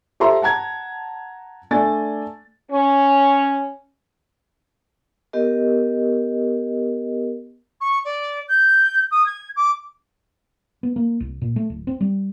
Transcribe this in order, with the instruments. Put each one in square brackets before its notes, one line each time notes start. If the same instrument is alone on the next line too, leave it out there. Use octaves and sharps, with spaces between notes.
[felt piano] G4 A4 C5 E5 A#5 C6
F#5 A5 A#5 G#6
A3 D4 D5 G#5 A6
[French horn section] C#4
[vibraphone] B3 G4 A#4 D#5
[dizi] C#6
D5
G6
D#6
G#6
D6
[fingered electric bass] B3
A#3
C2
A#2
A3
D1
C4
G3